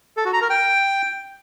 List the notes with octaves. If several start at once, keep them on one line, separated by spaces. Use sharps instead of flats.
A4
F#4
A#5
A#4
G5